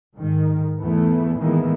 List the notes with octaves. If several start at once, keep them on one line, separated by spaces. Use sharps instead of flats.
G#2 D#3
E2 E3 A3 B3
A2 D#3 E3 G#3 A#3 B3